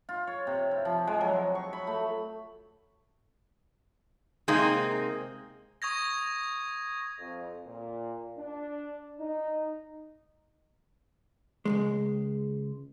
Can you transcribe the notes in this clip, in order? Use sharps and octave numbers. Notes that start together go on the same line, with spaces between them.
F4
C#5
C3
E4
F3
G#3
F#3
C#6
B5
A3
C3 G#3 A#3 C4 D#4 G#4
C#6 D#6 G#6 A#6
F2
A#2
D4
D#4
C#2 G2 G#3